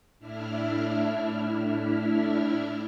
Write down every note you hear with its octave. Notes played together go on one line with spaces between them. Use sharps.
A2 D4 E4 E5 F6